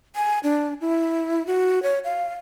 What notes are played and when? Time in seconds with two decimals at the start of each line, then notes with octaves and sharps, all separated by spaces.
0.16 G#5
0.44 D4
0.81 E4
1.47 F#4
1.83 C#5
2.04 F5